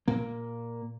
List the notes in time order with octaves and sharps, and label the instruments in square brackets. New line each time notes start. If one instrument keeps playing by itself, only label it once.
[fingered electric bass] A#2 A#3